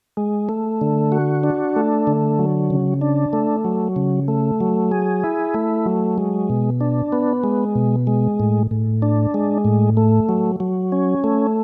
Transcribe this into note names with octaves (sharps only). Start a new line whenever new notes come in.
G#3
A3
D3
F#4
D4
A3
D3
F#3
C#3
D4
A3
F#3
C#3
A3
F#3
G#4
E4
A3
F#3
G#3
B2
D4
B3
G#3
B2
G#3
A2
A2
D4
G#3
A2
A3
F#3
F#3
C#4
A3